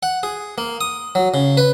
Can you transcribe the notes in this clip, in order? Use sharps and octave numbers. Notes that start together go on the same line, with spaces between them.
F#5
G#4
A#3
D#6
F#3
C#3
B4